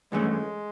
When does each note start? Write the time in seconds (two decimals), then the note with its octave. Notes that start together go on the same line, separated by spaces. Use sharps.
0.12 G2 E3 G#3 A3 C#4
0.30 G#3